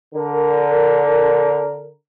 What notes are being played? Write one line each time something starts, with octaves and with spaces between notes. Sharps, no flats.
D3 A#4